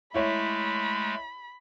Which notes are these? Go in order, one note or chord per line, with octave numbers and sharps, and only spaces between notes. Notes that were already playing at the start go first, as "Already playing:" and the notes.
G#3 A3 E4 C#5 E5 B5